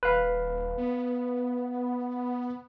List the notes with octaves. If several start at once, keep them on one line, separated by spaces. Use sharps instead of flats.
D#1 B4 F5
B3